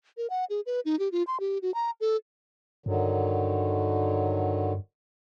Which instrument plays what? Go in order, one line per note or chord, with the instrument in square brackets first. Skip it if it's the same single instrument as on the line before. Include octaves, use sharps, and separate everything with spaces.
[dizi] A#4
F#5
G#4
B4
D#4
G4
F4
C6
G4
F#4
A#5
A4
[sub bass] G2 [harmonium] D3 D#3 F#3